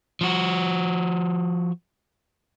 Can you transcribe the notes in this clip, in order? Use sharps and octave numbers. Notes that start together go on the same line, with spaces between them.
F3 F#4